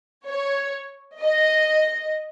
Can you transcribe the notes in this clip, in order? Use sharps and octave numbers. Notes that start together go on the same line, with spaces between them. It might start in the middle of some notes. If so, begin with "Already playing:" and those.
C#5
D#5